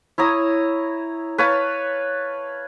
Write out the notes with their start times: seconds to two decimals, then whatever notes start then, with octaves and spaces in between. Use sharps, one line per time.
0.18 E4 C#5 A#5 D#6
1.38 B4 C#5 F5 A5